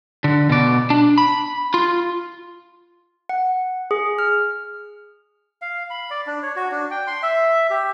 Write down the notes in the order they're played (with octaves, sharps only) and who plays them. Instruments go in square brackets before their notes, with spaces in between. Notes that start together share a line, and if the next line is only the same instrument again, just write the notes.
[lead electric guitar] D3
B2 D5
D4
B5
F4
[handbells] F#5
G#4
F6
[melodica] F5
B5
D5
D4
C#5
F#4
D4
G5
C6
E5
G4